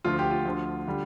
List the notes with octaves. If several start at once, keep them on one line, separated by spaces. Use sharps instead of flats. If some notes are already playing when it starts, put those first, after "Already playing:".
D2 D3 F3 F4
G4
F4
D2 D3 F3
D3 G3